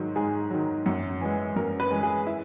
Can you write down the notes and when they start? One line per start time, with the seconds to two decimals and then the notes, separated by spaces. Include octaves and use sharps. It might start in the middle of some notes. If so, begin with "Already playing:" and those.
Already playing: G#2 D#3 F#3 F#4
0.16 G#2 G#4
0.50 D#3 F#3
0.86 F#2
1.21 E3 G#3
1.56 F#2 A#4
1.80 B4
1.91 E3 G#3
2.03 G#4
2.27 E4